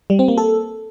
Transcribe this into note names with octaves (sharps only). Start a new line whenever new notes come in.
G3
C4
A#3
A4